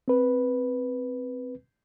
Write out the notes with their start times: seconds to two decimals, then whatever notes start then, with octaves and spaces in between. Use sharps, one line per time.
0.08 C4 B4